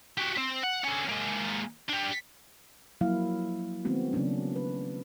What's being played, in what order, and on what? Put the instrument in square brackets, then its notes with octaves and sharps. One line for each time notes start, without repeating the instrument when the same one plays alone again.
[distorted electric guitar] F#4 G4
C4
F#5
D3 C#4
G#3 A#3
D4 G4
[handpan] F3 F#3 A#3 E4 F5
D#3 G#3 A3 B3 C4 F#4
C#3 F#3 A#3 C#4 D4
B4